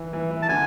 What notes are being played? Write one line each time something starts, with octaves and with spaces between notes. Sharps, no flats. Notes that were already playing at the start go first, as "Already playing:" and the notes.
Already playing: E3
E3
E3
A5
D3 G#5